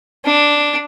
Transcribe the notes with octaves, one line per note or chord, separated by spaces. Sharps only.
D4